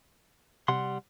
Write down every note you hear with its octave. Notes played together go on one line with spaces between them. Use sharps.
C3 G3 F#5 C6